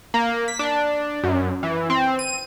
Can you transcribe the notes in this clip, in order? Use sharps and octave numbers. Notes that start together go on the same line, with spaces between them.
A#3
B6
D4
F#2
E3
C4
D#7